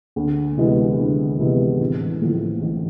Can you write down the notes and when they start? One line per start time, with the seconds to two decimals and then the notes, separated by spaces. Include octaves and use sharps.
0.16 D2
0.57 C3 E3 G#3 B3
0.98 D2
1.39 C3 E3 G#3 B3
1.80 A1
2.21 A2 F3
2.62 A1